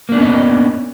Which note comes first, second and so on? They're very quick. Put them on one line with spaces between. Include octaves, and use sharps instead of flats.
A#3 D4 B3 C#4 D#5